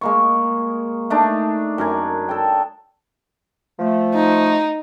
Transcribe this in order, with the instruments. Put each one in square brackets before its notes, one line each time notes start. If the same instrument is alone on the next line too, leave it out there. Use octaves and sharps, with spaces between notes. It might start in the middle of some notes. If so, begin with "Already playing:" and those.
[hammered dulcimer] G#3 A#3 C#6
A3 D4 D#4
F#2 A#4 G#5
A4 G5
[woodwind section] F3 A3
[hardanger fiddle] D#4